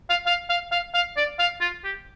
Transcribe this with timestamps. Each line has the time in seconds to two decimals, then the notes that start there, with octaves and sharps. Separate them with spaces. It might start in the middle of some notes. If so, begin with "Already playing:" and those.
0.10 F5
0.26 F5
0.50 F5
0.72 F5
0.94 F5
1.17 D5
1.39 F5
1.61 F4
1.84 G4